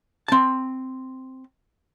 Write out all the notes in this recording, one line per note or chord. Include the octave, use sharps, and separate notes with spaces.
C4 A5